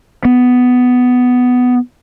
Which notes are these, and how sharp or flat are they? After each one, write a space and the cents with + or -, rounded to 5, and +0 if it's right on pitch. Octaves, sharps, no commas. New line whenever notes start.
B3 +10